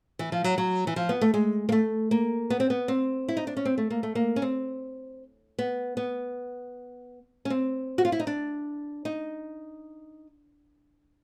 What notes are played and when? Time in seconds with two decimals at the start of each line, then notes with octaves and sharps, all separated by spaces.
0.19 E3
0.32 F3
0.44 F#3
0.58 F#3
0.87 E3
0.96 F3
1.09 B3
1.21 A3
1.34 G#3
1.69 A#3
1.72 A3
2.11 A#3
2.50 B3
2.60 C4
2.70 B3
2.88 C4
3.28 E4
3.37 D#4
3.47 D4
3.57 C#4
3.65 C4
3.78 A3
3.90 A#3
4.03 A3
4.15 A#3
4.36 C#4
4.42 C4
5.59 B3
5.97 B3
7.45 C#4
7.50 C4
7.98 F#4
8.05 F4
8.12 E4
8.20 D#4
8.27 D4
9.05 D#4